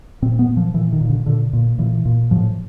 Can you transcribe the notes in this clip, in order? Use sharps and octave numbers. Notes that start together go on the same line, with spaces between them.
A#2 C4
B3
A#2
F3
A#2 E3
D#3
A#2
D3
A#2 D3
A#2
A#2 E3
A#2
A2 F3